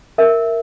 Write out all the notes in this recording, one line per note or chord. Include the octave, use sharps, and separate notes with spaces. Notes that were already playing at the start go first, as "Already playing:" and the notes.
A#4 E5